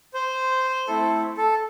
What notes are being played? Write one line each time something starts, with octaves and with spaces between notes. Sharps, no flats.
C5
A3 C4 E4 A4
A4